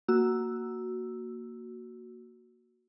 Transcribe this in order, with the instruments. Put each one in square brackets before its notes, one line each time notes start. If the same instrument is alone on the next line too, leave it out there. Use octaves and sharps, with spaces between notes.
[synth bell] A#3 F#4 E6